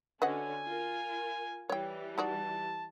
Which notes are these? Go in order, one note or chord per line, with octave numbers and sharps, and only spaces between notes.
D3 C#4 F#4 B4 D#5 F#5 G#5
F4 A#4
E3 G3 C#5 G5
D#4 F#4 D5 A5